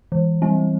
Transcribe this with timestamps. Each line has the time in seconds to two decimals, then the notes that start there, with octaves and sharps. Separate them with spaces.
0.12 E3
0.42 G3 C4